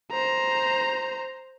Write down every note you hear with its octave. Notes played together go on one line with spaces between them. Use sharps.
C5 A#5